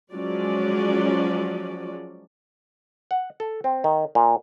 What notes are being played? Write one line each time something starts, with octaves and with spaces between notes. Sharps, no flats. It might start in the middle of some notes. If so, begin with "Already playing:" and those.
F3 F#3 G#3 C#4 D5
F#5
A4
C4
D#3
A#2